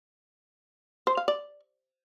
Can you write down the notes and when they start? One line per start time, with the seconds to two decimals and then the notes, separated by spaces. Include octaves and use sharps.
1.07 C5
1.17 F5
1.28 D5